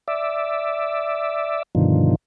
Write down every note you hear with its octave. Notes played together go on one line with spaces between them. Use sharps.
D5 E5
G2 B2 D3 D#3 F3